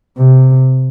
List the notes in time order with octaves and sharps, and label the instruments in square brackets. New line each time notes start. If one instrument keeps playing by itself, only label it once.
[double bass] C3